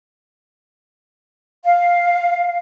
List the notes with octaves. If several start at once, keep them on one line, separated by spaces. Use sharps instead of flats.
F5